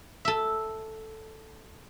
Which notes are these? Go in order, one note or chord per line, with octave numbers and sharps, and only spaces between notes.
A4 E5